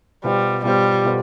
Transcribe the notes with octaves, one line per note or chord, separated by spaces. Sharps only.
B2 G3 B3 F4 C5
B2 G3 B3 F4 C5
B2 B3 F4 A4 C5